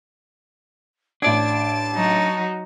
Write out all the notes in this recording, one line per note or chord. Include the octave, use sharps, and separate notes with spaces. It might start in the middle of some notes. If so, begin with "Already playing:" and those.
A1 D4 D5 A5 G#6
F#3 D#4 F#4